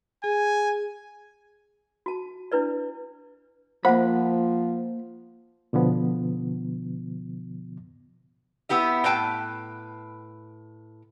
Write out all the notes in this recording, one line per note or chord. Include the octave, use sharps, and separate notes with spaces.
G#4 G#5
F#4 A5
D4 E4 B4 D5
F3 A#3 C5 F#5 B5
B2 D3 F3 B3
B3 E4 G4 E5
A2 B4 G5 A5